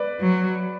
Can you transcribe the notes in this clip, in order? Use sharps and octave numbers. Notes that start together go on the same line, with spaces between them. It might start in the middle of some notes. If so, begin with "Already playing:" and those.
Already playing: B4 D5
F#3